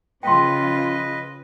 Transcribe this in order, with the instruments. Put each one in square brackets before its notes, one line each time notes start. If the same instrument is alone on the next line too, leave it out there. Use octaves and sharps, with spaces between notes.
[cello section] C#3 F3 F4 [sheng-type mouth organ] B4 D#5 [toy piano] G5 C6